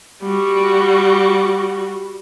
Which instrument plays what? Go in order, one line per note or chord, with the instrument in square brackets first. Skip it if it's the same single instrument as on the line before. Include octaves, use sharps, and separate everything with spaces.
[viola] G3 F#4